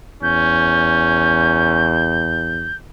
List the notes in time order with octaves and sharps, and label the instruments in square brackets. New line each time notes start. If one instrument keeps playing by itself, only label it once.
[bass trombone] E2 [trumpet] C#4 [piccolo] G6